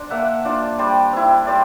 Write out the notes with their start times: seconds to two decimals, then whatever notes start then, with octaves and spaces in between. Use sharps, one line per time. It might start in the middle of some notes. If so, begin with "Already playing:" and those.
Already playing: D4 C5
0.10 A#3 E5 F#5
0.45 D4 F4
0.79 G3 C5 D5
1.13 C4 E4
1.47 G3 C5 D5